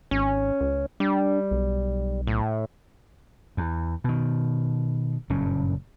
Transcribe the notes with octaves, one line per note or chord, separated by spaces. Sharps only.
G#1 C#4
C#2
G3 D4
B1
A2
E2
B2 D#3
F#1 G2 A#2 C#4